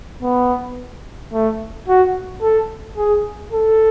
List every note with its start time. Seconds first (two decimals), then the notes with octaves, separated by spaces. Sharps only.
0.22 B3
1.33 A3
1.88 F#4
2.42 A4
2.97 G#4
3.52 A4